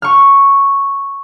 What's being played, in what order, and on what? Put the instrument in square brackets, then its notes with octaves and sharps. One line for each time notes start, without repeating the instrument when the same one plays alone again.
[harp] C#6 F6